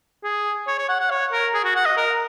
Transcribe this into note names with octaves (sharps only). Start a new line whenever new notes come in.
G#4
C#5
C#5
F#5
F#5
C#5
A#4
G#4
F#4
F#5
D#5
A#4